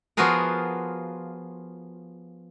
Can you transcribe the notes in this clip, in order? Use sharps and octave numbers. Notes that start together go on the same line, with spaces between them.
F3 B3 F4 F#4 G#4 A#4